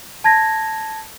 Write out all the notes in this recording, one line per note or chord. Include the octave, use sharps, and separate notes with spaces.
A5 G#6 A#6